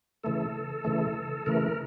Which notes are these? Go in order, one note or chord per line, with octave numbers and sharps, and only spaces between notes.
C#3 E3 A3 A4
C#3 E3 A3
C#3 E3 A3 A#4